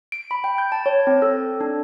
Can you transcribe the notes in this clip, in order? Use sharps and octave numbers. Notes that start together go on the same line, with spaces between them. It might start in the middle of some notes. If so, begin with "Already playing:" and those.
D7
B5
G5
G6
A5
C#5
C4
A4
D4